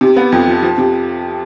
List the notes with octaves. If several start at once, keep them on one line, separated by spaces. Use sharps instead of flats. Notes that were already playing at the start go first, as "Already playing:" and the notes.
C3
B3
F2
F3
F3
C3